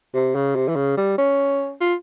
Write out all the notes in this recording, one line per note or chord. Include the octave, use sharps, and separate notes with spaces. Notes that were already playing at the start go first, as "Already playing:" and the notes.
C3
C#3
C3
E3
C#3
G3
C#4
F4